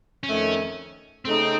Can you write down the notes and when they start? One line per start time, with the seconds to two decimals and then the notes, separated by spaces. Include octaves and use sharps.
0.23 F2 D#3 A3 C#4
1.25 C#3 A3 C4 D#4